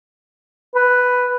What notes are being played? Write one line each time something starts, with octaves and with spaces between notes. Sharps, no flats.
B4